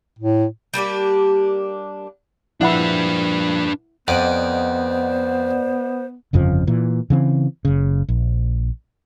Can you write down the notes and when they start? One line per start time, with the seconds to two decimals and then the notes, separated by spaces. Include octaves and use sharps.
0.19 A2
0.74 G3 A#3 D4 G4
2.61 A#2 F3 D4 E4 B4 F#5 B5
4.08 F2 B3 C5 D5 D#5 F#5
6.33 G1 F2 C#3 F3
6.67 A#2 E3
7.10 C#3 E3 C4
7.65 F#1 C#3
8.09 A#1